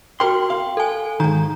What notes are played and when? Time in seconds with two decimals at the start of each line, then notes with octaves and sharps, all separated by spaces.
0.20 F#4 A#4 G5 C6
0.50 F5
0.77 A4 G#5
1.20 G#2 D#3 A#5